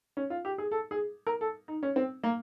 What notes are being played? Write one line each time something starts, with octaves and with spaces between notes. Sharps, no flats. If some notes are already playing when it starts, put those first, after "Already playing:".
C#4
F4
G4
G#4
A4
G#4
A#4
A4
D#4
C#4
C4
A#3